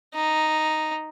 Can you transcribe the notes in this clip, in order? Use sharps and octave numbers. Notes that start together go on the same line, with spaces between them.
D#4